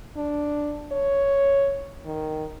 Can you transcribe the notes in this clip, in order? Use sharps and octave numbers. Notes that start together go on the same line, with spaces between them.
D4
C#5
D#3